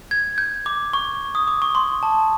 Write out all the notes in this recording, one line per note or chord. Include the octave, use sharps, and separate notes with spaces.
G#6
G6
D6
C#6
D#6
D6
C#6
C6
A5